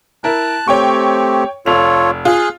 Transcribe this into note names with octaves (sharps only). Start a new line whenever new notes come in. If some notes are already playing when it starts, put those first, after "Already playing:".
E4 A#4 A5 F#6
A3 C4 G4 C#5 G5 C#6
F1 F4 A4 C#5 F7
F4 G#4 F#6